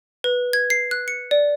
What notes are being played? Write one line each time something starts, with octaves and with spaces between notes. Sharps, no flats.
B4
G#6
C7
F#6
C#7
D5